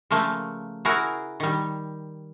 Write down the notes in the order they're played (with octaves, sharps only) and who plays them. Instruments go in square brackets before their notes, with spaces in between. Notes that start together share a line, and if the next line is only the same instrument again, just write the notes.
[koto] C#3 F3 A3 A#3
E4 F#4 G#4 A#4
D#3 G3